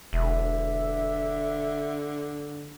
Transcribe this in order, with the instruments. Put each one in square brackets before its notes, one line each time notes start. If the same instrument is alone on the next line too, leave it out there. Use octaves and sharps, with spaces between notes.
[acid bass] E1 [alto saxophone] D3 [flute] E5